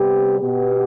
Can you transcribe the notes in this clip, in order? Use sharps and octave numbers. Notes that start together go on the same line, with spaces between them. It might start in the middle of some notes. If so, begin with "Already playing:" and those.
Already playing: C3 G3 B3 G4
B2 B3 G4